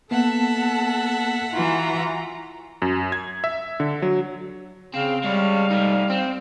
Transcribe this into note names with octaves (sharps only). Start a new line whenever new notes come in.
A#3 B3 A4 E5 F#5 A5
E3 F4 F#4 A#5
F#2
G#6
E5
D3
F#3
C#3 C4 F5
G3 G#3 C#5
A3 D#4
C4